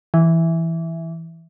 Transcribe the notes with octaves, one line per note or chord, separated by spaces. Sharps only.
E3